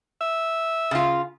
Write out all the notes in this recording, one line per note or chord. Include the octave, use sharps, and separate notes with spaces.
E5
C#3 F4